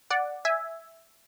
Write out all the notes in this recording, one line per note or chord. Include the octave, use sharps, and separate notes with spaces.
D5 F#5
E5 G#5